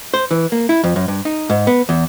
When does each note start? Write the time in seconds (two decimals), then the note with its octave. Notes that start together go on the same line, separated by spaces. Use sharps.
0.14 C5
0.31 E3
0.52 A#3
0.69 E4
0.84 F2
0.96 F#2
1.08 G2
1.25 D#4
1.50 G#2
1.67 B3
1.89 E2